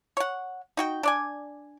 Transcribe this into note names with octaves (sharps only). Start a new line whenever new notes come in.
C#5 F#5
D#4 F#4 G5
D4 D5 G#5